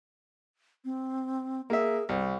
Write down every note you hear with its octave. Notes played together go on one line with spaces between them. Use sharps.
C4
A#3 G#4 E5
C2 C5